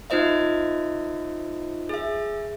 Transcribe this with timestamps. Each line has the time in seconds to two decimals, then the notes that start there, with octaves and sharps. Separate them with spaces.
0.10 D#4 F4 C5 D#5 E5
1.89 G#4 E5